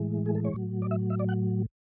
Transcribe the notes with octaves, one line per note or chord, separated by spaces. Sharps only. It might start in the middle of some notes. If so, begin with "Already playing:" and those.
Already playing: A2 E3 G#3
G#4
A4
C#5
A2 F#3
D5
E5
E5
D5
F#5